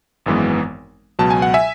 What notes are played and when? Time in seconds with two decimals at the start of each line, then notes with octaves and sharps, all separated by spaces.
0.26 G#1 F#2 E3 G#3 B3
1.19 C#2 B2 F#3 A5
1.30 G#5
1.42 F#5
1.54 E5 G#5